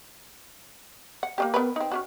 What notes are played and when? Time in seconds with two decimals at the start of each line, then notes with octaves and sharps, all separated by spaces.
1.23 F#5
1.38 A#3 D4 G4
1.54 B3 A#4 B4
1.76 C4 D#4
1.92 C#4 D4 F#4